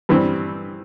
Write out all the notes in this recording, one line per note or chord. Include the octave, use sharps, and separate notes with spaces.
G2 E3 G3 C4